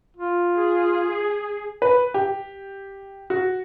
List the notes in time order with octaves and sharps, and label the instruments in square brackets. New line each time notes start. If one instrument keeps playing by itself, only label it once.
[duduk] F4
[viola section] G#4
[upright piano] B4
G4
F#4